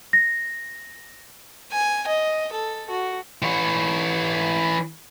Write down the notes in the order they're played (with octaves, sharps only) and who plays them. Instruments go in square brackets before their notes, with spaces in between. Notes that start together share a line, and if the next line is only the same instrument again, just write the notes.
[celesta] A#6
[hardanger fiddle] G#5
D#5
A4
F#4
[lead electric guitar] E3 C#5